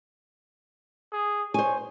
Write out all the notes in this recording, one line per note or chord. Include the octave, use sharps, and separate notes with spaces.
G#4
C5 C#5 G#5